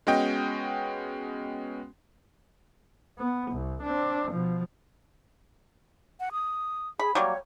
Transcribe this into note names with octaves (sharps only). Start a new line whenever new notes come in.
G#3 B3 C#4 F#4 D#5 G5
B3
C2
C4 D4
B2 F3
F#5
D#6
G#4 B5
F#3 G3 A#3 C#5